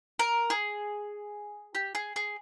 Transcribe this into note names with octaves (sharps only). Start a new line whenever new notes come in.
A#4
G#4
G4
G#4
G#4